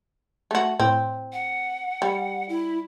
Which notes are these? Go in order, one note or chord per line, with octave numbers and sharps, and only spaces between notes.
A3 F#4
A2 C4
F#5
G3
E4